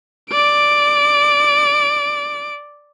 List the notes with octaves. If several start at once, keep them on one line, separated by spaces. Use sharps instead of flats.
D5 D7